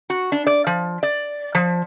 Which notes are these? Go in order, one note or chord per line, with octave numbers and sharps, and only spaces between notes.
F#4
D4
D5
F3
D5
F3